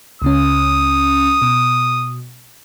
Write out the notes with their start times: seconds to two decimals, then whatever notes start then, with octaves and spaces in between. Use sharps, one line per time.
0.22 C#2 C#3 C#4 D#6
1.42 B2